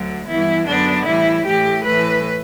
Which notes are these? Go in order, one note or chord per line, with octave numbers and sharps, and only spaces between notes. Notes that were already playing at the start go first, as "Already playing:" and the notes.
Already playing: D2 D3 F#3
G2 E3 B3 E4
F#2 D3 F#3 B3 D4
A2 E3 G3 E4
A2 E3 A3 G4
A2 E3 A3 B4